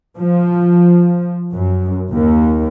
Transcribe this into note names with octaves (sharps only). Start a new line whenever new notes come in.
F3
F#2
D#2